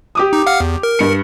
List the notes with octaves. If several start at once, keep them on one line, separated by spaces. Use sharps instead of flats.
G4 D6 D#6
D#4
F5 F#5 F6
E2
A#4
G2 C#7